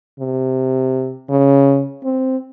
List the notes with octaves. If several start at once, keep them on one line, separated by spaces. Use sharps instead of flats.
C3
C#3
C4